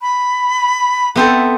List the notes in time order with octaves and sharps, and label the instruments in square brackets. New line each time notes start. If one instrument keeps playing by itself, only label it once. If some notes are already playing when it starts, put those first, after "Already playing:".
[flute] B5
[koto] B3 C4 A4 [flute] E5